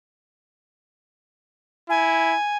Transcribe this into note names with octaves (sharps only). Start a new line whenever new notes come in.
E4 G#5